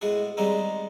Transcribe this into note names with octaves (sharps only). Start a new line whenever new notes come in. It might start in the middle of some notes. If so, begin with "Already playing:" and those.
A2 G#3 B3 F#4 G#4
D#3 G3 G#3 B3 C4 D#4